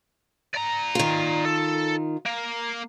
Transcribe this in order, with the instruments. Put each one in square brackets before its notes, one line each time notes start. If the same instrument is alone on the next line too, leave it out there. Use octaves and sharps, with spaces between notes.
[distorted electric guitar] D5 A#5
[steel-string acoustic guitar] D#3 F4
[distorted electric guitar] A4
A#3